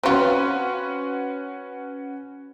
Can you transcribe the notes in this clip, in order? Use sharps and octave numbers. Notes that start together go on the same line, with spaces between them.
C4 C#4 F4 F#4 B4